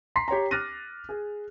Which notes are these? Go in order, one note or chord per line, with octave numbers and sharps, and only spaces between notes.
A#5 C6 B6 C7
G4 C#5 G5 A#5
D6 F6 F#6 A6 A#6 D#7
G#4